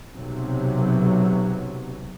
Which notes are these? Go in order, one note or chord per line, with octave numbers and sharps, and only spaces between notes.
B1 C3 F#3